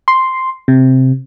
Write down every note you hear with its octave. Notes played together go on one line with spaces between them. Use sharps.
C6
C3